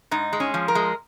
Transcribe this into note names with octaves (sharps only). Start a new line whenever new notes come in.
G#2 D#4
G#3
C#4
F3
A#4
G#3